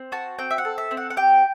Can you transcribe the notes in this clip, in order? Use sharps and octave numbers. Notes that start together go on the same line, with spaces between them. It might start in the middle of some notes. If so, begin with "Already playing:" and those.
Already playing: C4
F#4 A5
C4 G5
E5
F#5
A4
E5
C4
F#5
F#5
G4 G5